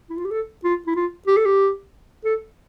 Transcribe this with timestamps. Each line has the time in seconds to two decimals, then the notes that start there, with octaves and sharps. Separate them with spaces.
0.10 E4
0.17 F4
0.25 G4
0.31 A4
0.64 F4
0.87 E4
0.96 F4
1.27 G4
1.37 A4
1.45 G4
2.25 A4